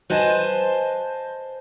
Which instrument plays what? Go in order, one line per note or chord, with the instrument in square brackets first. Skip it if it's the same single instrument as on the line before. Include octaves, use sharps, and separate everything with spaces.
[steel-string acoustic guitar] B4 C5 D#5 G#5 A5